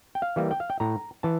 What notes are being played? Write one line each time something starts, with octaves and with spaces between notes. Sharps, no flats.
G5
F5
E3 G3 A#3
G5
F5
G5
A2 A#5
E3 A5